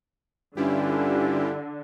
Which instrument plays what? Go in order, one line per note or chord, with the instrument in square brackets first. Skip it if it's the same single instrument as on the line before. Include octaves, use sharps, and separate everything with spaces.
[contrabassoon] G2 [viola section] D3 [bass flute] C#4 [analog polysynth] E4 F4 G4